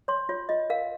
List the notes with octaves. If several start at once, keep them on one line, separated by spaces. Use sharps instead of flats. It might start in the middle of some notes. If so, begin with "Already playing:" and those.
C#5 C6
F4 C#5
F4 D#5
A#4 F5